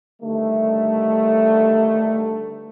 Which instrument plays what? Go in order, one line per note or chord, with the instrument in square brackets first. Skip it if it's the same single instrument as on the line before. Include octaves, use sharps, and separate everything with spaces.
[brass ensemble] G2 D3 D#3 G3 A3